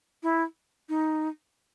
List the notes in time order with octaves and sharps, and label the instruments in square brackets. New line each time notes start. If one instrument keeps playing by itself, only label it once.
[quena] E4
D#4